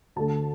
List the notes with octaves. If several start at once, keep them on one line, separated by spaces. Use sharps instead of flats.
D2 D3 A3 A5